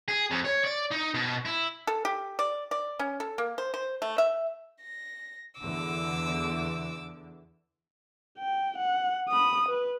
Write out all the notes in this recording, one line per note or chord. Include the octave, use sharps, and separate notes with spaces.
G#4
F2
C#5
D5
D#4
B2
E4
A4
G4
D5
D5
C#4
A4
A#3
C5
C5
A3
E5
A#6
E2 D3 D6 E6
G5
F#5
B5 D#6
B4